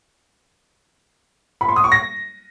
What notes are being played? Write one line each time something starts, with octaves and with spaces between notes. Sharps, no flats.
B5
C6
D#6
C#6
A#6